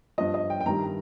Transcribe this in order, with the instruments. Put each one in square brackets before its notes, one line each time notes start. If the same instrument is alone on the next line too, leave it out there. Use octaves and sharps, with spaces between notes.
[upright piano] G2 F3 D#5
D#5
G5
G5
G2 D#3 G3 A#5